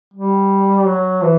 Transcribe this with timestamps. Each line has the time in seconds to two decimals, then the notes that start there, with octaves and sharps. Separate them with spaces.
0.14 G3
0.86 F#3
1.22 E3